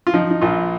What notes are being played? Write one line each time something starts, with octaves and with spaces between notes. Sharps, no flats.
F4
F3 D#4
D#4
A#1 F4